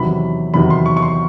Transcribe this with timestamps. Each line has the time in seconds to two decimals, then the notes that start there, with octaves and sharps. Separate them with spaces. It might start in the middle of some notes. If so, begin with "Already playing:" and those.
Already playing: E2 C3 D#3 F#3 B5
0.54 E2 C3 D#3 F#3 B5
0.70 C6
0.86 C#6
0.97 C#6
1.02 C6